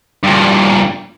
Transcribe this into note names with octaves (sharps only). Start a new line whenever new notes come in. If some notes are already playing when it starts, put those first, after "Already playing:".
G2 A#2